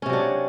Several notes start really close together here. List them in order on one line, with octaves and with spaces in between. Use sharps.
C#4 C3 F#3 D4